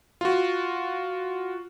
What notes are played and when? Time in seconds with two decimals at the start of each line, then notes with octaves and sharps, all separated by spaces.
0.21 F4 F#4